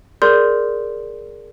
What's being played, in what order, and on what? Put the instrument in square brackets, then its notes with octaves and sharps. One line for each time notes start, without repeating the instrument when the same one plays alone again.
[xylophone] G#4 A#4 D5 C6 G6